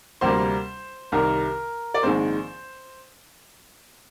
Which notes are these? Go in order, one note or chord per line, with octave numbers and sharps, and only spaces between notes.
D2 C3 G3 A#3 C5
C2 C3 D#3 A#4
D5
A#1 G#2 D#3 G#3 C4 C5